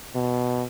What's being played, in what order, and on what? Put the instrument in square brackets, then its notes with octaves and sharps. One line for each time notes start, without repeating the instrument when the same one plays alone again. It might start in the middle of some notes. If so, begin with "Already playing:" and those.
[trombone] B2